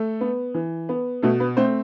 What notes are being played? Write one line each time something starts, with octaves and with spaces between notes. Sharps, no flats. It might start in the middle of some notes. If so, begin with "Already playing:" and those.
Already playing: A3 A4
B3
E3
B3
B2 A3 A4
B3 B4
A3 C4 C5